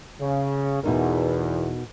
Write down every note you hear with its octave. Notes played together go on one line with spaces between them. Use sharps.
C#3
E2 B2 D#4 A#4